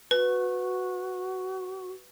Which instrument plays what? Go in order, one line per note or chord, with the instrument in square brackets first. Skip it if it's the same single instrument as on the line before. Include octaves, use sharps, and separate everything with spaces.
[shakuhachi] F#4 [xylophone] B4